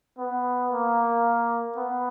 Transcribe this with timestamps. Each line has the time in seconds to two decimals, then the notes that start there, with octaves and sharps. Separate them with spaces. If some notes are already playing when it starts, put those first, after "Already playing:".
0.18 B3
0.71 A#3
1.77 B3